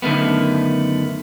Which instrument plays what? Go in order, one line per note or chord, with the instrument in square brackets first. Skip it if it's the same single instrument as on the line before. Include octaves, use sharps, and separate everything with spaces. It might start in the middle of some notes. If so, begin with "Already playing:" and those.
[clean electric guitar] F#2 D3 D#3 A3 B3